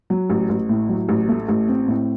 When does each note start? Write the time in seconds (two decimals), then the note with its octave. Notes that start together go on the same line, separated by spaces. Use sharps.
0.10 F#3
0.30 A1
0.49 A1
0.69 A2
0.89 F#3
1.09 A1
1.29 A3
1.48 A1
1.68 C4
1.88 A2